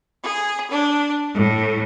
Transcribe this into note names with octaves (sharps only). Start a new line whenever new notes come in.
G#4
D4
A2